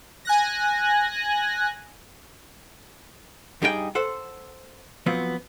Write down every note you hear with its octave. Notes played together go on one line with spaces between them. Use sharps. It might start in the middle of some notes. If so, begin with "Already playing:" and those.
G#5 F#6 A#6
G2 G3 D#4 G#4 A4 G5
A4 C5 F#5
F3 F#3 B3 C4